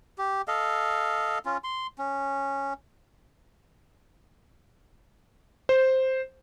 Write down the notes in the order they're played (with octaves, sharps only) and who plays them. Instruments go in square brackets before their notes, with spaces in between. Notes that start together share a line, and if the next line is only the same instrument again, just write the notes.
[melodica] G4
A4 D#5 F5
C#4 F4
C6
C#4
[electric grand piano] C5